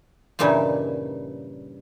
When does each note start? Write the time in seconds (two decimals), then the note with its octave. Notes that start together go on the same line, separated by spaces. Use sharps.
0.39 G2 A#2 C#3 E3 G3 D#4